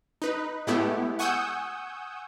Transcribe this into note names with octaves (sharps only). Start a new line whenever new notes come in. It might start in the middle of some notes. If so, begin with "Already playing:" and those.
D#4 B4
A2 G#3 A3 B3 E4 G4
F#5 G#5 C#6 D#6 E6 G6